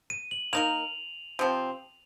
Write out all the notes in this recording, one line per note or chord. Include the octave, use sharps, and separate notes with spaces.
D#7
F#7
A#3 D#4 A#4 F7
C3 F3 C4